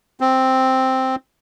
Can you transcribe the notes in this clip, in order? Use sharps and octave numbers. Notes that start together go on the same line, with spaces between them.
C4